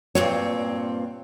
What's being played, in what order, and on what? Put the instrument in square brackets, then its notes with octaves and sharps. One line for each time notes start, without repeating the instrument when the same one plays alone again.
[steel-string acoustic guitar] G2 A#2 C4 [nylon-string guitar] C#5